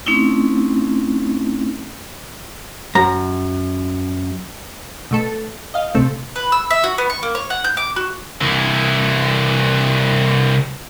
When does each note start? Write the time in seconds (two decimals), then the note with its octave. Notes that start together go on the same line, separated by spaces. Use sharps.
0.06 A3 C4 C#4 D#4 E4
2.95 F#2 A#5
5.11 B2 A3 A4
5.74 D#5 F5
5.94 C3 A3 B3 C4 A4
6.36 B4
6.52 E6
6.70 E5
6.84 F#4
6.98 B3
7.10 C#6
7.23 A#3
7.35 C#5
7.50 F#5
7.64 G6
7.77 D6
7.96 F#4
8.41 C2 E3